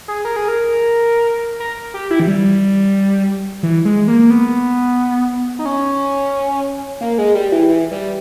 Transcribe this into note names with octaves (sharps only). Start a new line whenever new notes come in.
G#4
A#4
G#4
A#4
A#4
G4
E4
E3
G3
E3
G#3
A#3
A#3
B3
D#4
C#4
A#3
G#3
G3
E3
E3
G3